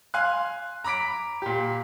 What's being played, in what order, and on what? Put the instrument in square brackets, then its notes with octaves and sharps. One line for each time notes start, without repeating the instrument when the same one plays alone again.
[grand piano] F5 G#5 C6 F#6
A#5 B5 D6 B6 D7
A#2 G4